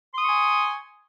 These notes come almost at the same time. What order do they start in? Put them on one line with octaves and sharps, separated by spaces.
C6 D#6 C#6 G#5